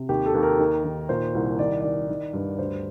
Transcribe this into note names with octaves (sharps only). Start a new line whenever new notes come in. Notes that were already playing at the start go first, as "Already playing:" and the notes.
Already playing: C3
D#2 G4
A4
D#2
A#4
D#3
D#3
A#2 C5
C2
D#3 D5
D#3 D5
D#3
G2
D2 C5